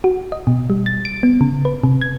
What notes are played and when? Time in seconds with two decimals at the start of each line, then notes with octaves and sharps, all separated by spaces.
0.04 F#4
0.32 D#5
0.47 B2
0.70 G3
0.86 A6
1.05 D7
1.23 B3
1.41 C#3
1.65 B4
1.84 C3
2.01 G#6